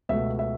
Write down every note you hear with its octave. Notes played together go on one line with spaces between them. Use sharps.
C#2 B2 A3 E5
E5